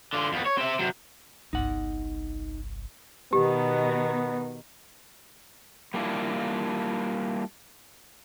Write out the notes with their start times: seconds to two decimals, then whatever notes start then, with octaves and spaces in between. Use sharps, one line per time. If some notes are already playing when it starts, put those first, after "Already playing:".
0.13 D3 F4
0.32 F2 B3
0.46 C#5
0.58 C4 E5
0.79 C3 F#3
1.53 G1 C2 D#4 F#5
3.33 B2 D#3 B3 D#4 G4
5.94 G3 A#3 D4 E4 F4